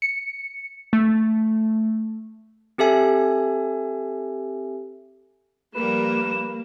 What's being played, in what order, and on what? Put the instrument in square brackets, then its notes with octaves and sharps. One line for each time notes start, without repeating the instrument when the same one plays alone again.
[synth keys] C#7
A3
[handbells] C4 G4 A4 E5 G#5
[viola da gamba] F3 G3 A#4 [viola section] A#3 [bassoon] B4 [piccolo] E7